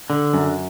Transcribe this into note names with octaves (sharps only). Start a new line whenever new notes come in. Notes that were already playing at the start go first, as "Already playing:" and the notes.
D3
F#2